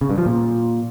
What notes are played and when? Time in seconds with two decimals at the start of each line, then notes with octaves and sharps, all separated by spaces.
0.01 C#3
0.10 G2
0.18 F3
0.26 A#2